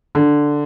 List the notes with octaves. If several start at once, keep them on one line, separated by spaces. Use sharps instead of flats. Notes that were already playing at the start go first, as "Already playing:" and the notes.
D3